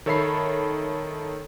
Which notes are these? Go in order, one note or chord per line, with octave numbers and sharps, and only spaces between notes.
D#3 A4 C#5 E5 B5 C7